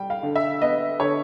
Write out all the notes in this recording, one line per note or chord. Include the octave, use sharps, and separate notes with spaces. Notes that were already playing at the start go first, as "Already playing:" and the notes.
Already playing: G3 G5
F5
D3
E5
B3 D#5
D3 C#5